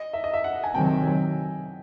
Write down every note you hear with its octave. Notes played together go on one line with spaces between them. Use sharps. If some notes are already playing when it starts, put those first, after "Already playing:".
Already playing: D#5
E5
D#5
E5
F#5
G#5
C3 D#3 F#3 G5